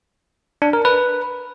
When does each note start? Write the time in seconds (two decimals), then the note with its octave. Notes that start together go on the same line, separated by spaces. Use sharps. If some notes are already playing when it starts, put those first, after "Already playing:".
0.62 D4
0.73 A#4
0.85 B4